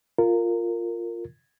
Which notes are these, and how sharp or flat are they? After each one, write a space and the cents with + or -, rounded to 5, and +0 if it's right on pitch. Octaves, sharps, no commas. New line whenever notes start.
F4 +0 A#4 -20